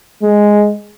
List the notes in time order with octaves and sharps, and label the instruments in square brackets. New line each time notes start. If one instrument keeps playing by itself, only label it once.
[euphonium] G#3